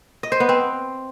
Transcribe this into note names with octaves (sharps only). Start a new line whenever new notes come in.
D#5
C5
B3
C4